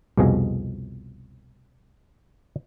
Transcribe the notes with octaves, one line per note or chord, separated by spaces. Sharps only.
C2 F2 B2 F3 G#4 D#5